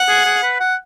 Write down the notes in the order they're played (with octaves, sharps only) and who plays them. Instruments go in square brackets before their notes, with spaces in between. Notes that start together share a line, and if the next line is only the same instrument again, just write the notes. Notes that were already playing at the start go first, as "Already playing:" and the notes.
Already playing: [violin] F#5
[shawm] G#4
G#4
B4
F#5